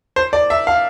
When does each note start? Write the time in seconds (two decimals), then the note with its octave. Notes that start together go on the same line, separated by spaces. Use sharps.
0.16 C5
0.33 D5
0.50 E5
0.67 F5